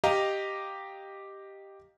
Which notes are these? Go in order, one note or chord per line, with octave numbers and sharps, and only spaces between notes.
G4 D#5 F5 A#5